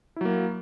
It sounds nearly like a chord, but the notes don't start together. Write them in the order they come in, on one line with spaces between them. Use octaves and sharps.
E4 F#3 A#3